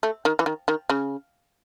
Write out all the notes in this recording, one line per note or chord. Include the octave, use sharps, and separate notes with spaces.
A3
D#3
E3
D#3
D#3
C#3